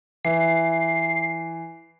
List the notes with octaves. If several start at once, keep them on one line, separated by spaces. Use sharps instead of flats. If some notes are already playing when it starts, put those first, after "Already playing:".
E3 C7